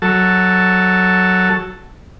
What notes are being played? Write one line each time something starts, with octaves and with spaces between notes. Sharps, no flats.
F#3 A4